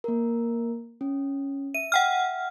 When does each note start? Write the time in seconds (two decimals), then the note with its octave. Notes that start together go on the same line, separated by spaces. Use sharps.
0.04 A#3 A#4
1.01 C#4
1.74 E5 D#7
1.92 F#5 G5 F6